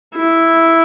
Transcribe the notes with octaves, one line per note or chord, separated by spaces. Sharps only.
E4